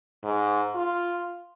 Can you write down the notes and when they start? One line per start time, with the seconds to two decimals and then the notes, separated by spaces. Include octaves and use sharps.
0.24 G#2
0.75 F4